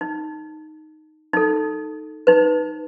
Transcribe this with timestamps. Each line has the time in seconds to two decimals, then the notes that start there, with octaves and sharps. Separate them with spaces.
0.01 D#4
1.33 D#4 A4
2.27 D#4 B4